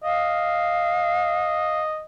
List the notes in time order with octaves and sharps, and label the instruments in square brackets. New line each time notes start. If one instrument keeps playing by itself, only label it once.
[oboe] D#5 [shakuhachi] F5